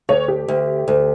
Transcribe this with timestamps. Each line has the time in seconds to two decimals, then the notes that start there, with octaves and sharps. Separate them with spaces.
0.09 D2 C#5
0.28 G4
0.48 D2
0.88 D2